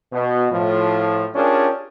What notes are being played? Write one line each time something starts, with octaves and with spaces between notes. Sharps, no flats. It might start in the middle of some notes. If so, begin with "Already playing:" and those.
B2
A2 F3
C#4 D4 F4 G4 G#4 A#4